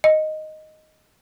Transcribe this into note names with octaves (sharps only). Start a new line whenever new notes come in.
D#5